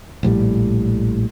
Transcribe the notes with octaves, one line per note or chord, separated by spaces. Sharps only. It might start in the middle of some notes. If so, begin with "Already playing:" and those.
A#1 A2 E3 G3